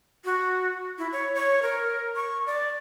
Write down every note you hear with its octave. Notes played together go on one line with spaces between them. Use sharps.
F#4
E4
C#5
C#5
A#4
C#6
D5